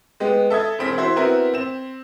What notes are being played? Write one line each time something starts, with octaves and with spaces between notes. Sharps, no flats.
G#3 B3 G4
A4 E5 D#6 G#6
E1 C4 B6
E4 F#4 C5
B3 C4 E4 F#4 A#4
C4 E7